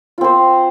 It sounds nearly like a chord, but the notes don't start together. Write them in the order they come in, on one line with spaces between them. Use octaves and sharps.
F4 C4 C5